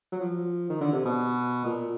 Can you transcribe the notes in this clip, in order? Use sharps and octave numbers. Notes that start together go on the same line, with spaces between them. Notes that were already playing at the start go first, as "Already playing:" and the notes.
F#3
F3
D#3
D3
C3
B2
A#2